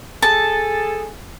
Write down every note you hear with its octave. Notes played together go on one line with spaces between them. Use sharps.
G#4 A4 A5